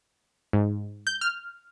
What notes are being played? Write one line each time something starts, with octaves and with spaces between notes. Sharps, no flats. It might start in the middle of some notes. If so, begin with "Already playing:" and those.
G#2
G6
F6